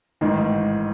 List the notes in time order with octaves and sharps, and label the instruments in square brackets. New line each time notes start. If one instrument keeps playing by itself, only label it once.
[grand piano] A1 G#2 D#3